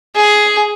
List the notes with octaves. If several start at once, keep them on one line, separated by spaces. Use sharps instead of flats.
G#4